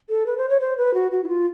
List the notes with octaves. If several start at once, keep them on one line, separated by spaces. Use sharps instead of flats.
A4
B4
C5
C#5
C5
B4
F#4
F#4
E4
F4